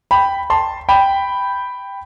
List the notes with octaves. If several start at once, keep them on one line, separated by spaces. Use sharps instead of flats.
G5 B5
A5 C6
G5 B5